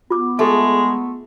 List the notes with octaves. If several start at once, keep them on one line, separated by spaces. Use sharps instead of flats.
B3 F4 D6
G#3 A3 G#4 A4 E5